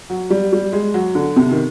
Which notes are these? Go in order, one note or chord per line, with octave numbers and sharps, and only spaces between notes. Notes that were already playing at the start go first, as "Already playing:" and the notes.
F#3
G3
G3
G#3
F#3
D3
C3
D#3